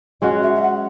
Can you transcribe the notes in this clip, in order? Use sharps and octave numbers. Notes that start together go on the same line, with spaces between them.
G#3 C#4 F#4 D#5
E5
E5
F#5